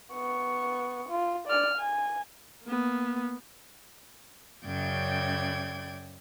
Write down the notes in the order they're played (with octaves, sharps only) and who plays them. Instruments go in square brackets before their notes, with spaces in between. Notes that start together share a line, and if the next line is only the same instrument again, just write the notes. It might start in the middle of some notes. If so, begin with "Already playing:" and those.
[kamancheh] B3 C#6
F4
D5 F6
G#5
[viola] A#3 B3
[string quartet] F#2 C#3 D5 G5 G6 G#6